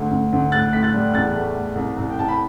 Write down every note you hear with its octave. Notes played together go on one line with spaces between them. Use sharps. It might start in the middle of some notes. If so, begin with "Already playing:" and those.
Already playing: D2
D2
D2
A2 F#6 A6
A2 B6
F#6 A6
G3
E2 F#6 A6
A3
A3
C2
C2
G5
C2 A5
B5